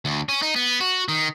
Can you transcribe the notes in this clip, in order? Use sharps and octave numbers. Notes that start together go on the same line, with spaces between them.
D2
C#4
D#4
B3
F#4
D#3